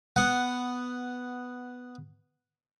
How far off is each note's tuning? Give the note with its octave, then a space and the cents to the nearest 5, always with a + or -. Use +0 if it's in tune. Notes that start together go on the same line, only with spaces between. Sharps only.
B3 +5 F#5 +0